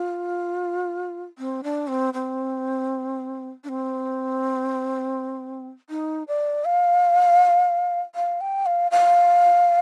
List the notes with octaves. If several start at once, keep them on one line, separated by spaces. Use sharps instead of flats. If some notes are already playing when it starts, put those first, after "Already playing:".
Already playing: F4
C4
D4
C4
C4
D4
C4
D#4
D5
F5
F5
G5
F5
F5